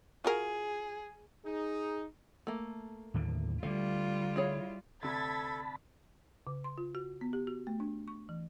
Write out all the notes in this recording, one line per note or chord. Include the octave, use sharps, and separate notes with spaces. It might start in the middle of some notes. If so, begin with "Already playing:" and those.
F4 F#4 G#4 A#4
D#4 G#4
A3 A#3
D#2 A2 D3
D3 G3 A3 F4 F5
E4 G#4 C#5
D2 C3 A4 A5 B5 G#6 A6 B6
C#3
C6
F4
F#4
B3
G4
F#4
A3
D4
C#6
E3